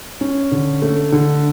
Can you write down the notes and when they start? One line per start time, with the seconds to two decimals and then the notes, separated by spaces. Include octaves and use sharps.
0.21 C#4
0.51 D3
0.82 A3
1.12 D3